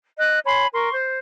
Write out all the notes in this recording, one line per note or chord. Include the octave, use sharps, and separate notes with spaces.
D#5 F#6
C#5 G#5 B5 C6
A#4 C6 C#6
C5